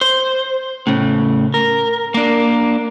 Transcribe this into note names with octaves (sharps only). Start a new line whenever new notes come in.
C5
A2 C#3
A#4
A#3 D4